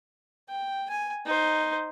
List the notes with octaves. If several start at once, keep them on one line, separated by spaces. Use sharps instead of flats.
G5
G#5
D#4 C5